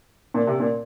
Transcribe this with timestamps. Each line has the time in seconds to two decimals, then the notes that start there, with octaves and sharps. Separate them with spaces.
0.34 A#2
0.47 C3
0.60 A#2